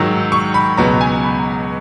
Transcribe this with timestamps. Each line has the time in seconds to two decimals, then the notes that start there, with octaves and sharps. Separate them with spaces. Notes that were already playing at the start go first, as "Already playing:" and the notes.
Already playing: G#2 D#3 F#3 E6
0.32 C#6
0.54 B5
0.77 C#2 B2 F#3 B3 A#5
1.01 G#5
1.24 B5